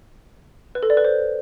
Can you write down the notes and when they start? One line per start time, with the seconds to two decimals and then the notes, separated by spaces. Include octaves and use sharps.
0.75 B4
0.83 A4
0.90 D5
0.97 B4
1.04 C5